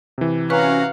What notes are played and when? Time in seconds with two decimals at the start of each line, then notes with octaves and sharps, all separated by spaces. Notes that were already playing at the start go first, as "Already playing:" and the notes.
0.18 C3 E3
0.50 C#4 F#4 B4 F5 F#5 A#5 C#6 F#6